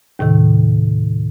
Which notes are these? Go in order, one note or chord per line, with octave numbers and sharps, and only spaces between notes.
D#2 A2 C3 D#3